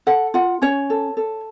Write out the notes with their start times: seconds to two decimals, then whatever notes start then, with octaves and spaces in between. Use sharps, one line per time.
0.07 A4 F#5
0.34 F4 F#5
0.62 C#4 C#5
0.90 A4
1.17 A4